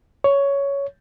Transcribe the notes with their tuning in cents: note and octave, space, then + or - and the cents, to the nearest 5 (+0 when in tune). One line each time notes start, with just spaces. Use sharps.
C#5 +10